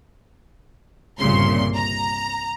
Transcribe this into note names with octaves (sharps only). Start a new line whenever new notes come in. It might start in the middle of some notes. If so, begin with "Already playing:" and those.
G1 C2 A#2 C#3 C6
A#5